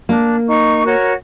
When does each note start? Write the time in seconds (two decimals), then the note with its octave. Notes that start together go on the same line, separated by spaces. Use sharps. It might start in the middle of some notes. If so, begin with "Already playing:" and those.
0.09 A#3 D4
0.46 D#4 C#6
0.84 F#4 A#4 C#5